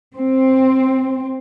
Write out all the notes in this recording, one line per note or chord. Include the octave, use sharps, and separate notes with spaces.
C4